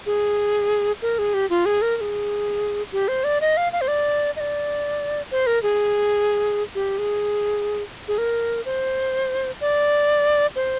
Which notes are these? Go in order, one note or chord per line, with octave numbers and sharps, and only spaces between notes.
G#4
A#4
G#4
G4
F4
G#4
A#4
A#4
G#4
G4
C5
D5
D#5
F5
F5
C5
D5
D#5
D5
C5
A#4
G#4
G4
G#4
G#4
A#4
C5
D5
C5